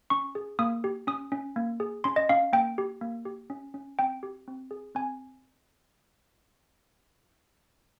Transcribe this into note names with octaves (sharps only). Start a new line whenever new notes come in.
C#4 C#6
G#4
A#3 D#6
G4
C#4 D#6
C#4
A#3
G#4
C#4 C6
D#5
C#4 F5
A#3 G5
G4
A#3
G4
C#4
C#4
C4 G5
G4
C4
G#4
C4 G#5